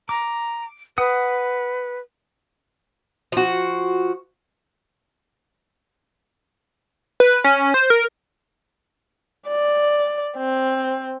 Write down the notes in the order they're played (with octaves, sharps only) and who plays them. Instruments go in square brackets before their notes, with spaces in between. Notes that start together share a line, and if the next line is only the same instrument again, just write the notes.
[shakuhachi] A#5 [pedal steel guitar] D6
[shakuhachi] B4 [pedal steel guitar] F#5 D#6
[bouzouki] F3 F#4
[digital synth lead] B4
C#4
C5
A#4
[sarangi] D5
C4